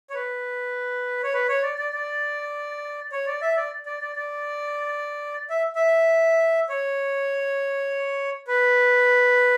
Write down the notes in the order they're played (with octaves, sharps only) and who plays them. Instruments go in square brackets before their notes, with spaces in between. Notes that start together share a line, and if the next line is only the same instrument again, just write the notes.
[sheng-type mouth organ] C#5
B4
C#5
B4
C#5
D5
D5
D5
C#5
D5
E5
D5
D5
D5
D5
E5
E5
C#5
B4